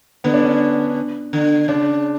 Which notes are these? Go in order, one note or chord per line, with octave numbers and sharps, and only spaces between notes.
D3 B3
D4
C#4
D3
C#3 D4